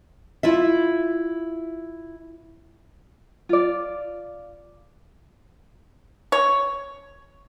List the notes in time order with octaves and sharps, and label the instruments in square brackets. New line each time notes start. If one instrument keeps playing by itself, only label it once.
[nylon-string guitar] E4 F4 E5
[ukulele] F4 D5
[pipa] C#5